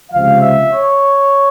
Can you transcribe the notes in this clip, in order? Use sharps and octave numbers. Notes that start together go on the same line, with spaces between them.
C#2 C3 F3 F5
E5
C#5